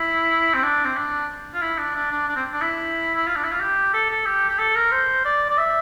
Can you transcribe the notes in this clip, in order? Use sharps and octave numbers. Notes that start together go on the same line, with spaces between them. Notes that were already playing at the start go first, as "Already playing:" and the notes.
Already playing: E4
C4
D4
C4
D4
F4
E4
D4
D4
D4
D4
C4
D4
E4
E4
F4
D4
E4
F4
G4
A4
A4
G4
G4
A4
A#4
C5
D5
D5
E5